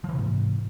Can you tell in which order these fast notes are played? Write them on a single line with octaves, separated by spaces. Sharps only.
F3 E3 C3 G#2